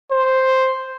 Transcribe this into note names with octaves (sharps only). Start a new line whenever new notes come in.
C5